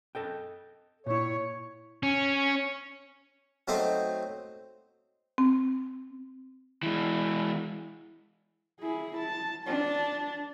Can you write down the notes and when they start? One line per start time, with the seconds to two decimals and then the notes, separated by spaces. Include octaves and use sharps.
0.15 A4 D#5 G5
1.06 A#2 E4 C#5
2.03 C#4
3.68 F#3 A3 C4 D#4 C5
5.38 C4
6.83 E3 G#3
8.80 E4 G#4
9.17 A5
9.65 D4 A5